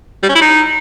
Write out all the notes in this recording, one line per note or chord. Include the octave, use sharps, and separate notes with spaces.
G3
C#4
E4
D#4